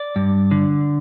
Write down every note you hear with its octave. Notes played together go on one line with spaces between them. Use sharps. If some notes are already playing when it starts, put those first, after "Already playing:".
Already playing: D5
G2
D3